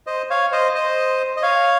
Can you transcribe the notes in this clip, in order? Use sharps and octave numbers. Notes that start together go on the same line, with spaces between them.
C5 D#5
C#5 F5
C5 D#5
C5 D#5
D#5
C#5 F5